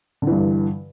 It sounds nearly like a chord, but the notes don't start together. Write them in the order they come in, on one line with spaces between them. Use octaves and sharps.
D3 E3 G2